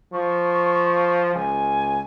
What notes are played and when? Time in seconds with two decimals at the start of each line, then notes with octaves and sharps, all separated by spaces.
0.13 F3 C#6
1.35 C#2 G#5